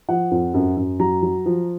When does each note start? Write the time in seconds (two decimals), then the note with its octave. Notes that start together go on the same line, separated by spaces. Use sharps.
0.09 F3 F#5
0.31 F2
0.54 F#2
0.77 F#2
1.00 F#3 A#5
1.23 F#3
1.46 F3